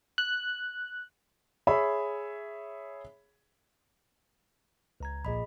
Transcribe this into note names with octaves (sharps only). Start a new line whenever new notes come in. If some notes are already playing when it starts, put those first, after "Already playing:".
F#6
G#4 C#5 E5 B5
C#2 A#5 G#6
A#1 A#2 G#4 D#5 B5